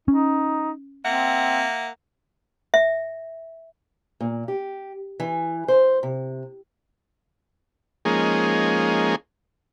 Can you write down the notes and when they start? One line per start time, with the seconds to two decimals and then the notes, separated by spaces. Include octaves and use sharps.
0.08 C#4 D#4
1.05 A#3 C4 E5 F#5
2.74 E5
4.21 A#2
4.48 G4
5.20 E3
5.68 C5
6.03 C3
8.05 F3 G#3 A#3 C#4 D#4 G#4